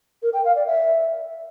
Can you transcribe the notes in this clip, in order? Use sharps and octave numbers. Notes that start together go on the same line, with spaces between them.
A#4
G5
F5
D5
E5